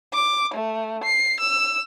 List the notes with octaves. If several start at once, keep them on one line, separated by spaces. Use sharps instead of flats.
D6
A3
C7
E6